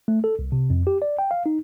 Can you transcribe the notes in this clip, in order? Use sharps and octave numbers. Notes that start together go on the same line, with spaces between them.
A3
A4
C2
C3
F2
G4
D5
G5
F5
D#4